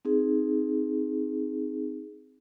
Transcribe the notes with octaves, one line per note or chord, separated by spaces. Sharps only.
C4 D#4 G#4